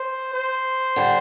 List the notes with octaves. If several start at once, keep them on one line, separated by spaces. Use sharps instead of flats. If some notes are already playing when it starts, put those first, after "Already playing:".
Already playing: C5
C5
D3 G3